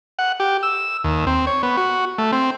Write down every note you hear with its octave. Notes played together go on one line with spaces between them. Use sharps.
F#5
G4
E6
D#2
C4
C#5
B3
F#4
A3
C4